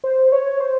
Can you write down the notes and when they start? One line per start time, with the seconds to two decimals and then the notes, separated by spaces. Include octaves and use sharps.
0.04 C5
0.32 C#5
0.60 C5